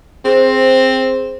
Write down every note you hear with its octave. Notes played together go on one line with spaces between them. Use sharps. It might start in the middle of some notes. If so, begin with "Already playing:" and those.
C4 G#4 C5